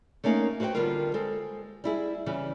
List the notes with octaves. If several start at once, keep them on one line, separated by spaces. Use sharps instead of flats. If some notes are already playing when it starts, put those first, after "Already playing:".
A3 A#3 C#4 D#4 F5 F#5
F#4 B4 C5 F5 G5
D3 G3 B3 F4 A#4
G#3 A4 C5
G3 E4 G#4
C#3 E3 G3